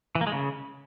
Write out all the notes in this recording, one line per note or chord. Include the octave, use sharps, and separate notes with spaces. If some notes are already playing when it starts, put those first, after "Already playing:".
E3
A#3
G#3
C#3